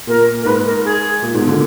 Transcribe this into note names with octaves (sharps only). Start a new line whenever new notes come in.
A#2 A#4
A#4
G#2 B4
A#4
G#4
A#2
G#2 B2
D#3
A#2 D3